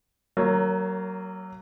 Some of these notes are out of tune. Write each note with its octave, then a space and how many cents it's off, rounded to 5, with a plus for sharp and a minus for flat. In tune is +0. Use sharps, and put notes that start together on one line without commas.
F#3 +25 A#3 -15 C#5 +0